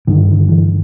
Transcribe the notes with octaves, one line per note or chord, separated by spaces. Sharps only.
G2 D3 D#3
E3